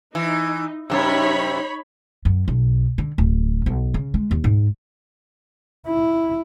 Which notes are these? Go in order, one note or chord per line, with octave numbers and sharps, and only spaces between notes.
E3 D#4
F#2 C3 D#4 C#5 B5
F#2
B1
D3
D1
B1
C#3
G#3
D#2
G#2
E4